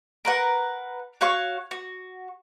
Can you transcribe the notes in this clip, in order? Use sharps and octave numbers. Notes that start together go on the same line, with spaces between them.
A#4 B4 F#5
F#4 C#5 F5 C#6
F#4